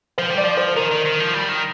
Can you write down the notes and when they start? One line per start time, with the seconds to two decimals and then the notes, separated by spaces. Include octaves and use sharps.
0.18 F3 C5
0.31 G3
0.38 D5
0.43 F3
0.57 C5
0.76 D#3 A#4
0.91 D#3
1.05 D#3
1.20 F3
1.34 G3
1.49 D#3